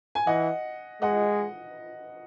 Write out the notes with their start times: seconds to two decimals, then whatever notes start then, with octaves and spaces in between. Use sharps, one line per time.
0.15 G#5
0.27 E3 D#5 F#5
1.02 G#3 D#5 F#5